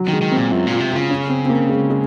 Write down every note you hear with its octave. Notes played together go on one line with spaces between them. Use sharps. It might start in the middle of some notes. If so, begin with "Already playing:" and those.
Already playing: F#3
D#3
G#3
D#3
C4
A#2
F#2 F4
A#2 F4
C3
C#3 F4
C#4
C4
C4
A#3
G#3
G#3